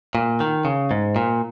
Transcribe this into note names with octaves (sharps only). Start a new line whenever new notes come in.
A#2
D#3
C#3
G#2
A#2